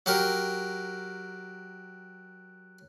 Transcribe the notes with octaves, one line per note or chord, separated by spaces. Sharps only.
F#3 G4 A#4